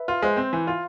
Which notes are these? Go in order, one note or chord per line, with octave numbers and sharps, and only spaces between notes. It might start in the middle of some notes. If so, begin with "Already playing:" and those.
Already playing: B4 E5
F4
G#3 C5
C4
E3
F4